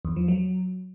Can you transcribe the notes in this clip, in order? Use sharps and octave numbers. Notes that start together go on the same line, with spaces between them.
E2
F3
F#3